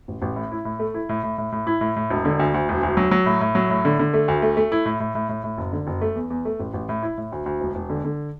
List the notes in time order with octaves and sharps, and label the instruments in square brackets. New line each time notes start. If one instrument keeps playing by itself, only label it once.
[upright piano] A1
A1
A2
E4
A2
A3
E4
A2
A2
A2
A2
E4
A2
A2
E1
D3
D2
D2
E1
D2
F#3
F#3
A2
A2
F#3
A2
D3
D3
A3
D2
A3
A3
E4
A2
A2
A2
A2
A2
F#1
D3
F#1
A3
E2
E2
A3
A1
A1
A2
E4
A2
D2
D2
E1
E1
D3
D3